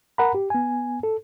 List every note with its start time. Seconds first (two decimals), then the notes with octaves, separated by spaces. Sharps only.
0.18 A#4 F#5 A#5 B5
0.35 G4
0.50 B3 G#5
1.03 A4